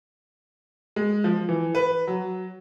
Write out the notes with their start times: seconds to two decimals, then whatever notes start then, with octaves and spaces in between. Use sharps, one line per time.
0.96 G#3
1.24 F3
1.49 E3
1.75 B4
2.08 F#3